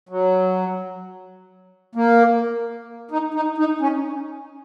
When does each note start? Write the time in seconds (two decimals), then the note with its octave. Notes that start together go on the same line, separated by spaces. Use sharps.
0.09 F#3
1.95 A#3
3.11 D#4
3.34 D#4
3.58 D#4
3.81 C#4